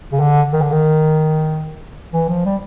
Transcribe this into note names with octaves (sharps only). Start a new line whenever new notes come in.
C#3
D3
D#3
D3
D#3
E3
F3
G3